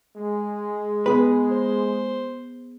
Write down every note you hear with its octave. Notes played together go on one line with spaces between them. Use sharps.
G#3
B3 G#4 B4
C5